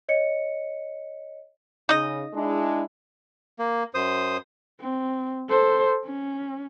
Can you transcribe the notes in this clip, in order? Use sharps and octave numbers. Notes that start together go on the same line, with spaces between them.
C#5 D#5 C#7
C#3 D#4 D#5
G#3 D4 E4
A#3
F#2 C5 D#6
C4
A4 C5
C#4